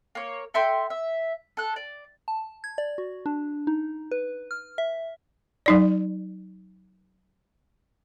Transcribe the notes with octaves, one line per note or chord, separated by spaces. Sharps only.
A#3 C#5
A4 E5 G5 C6
E5
A4 F#6
D5
A5
G#6
D5
F#4
D4
D#4
B4
F6
E5
F#3 D#4 D5